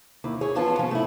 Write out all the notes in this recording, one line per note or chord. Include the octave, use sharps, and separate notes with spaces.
D#2 E4
G#4 C#5
E2 F3 B3 C#4 F4 A5
F3 C#4
A3 E4